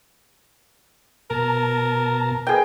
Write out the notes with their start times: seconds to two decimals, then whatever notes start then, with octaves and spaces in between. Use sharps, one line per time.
1.30 B2 A#4 A5 A#5
2.47 G#4 A#4 B4 D#5 G5